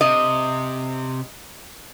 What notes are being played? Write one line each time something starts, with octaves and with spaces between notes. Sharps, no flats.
C3 D#5